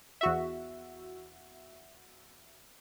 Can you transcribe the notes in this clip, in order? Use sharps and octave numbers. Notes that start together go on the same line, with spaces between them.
E2 F#4 E5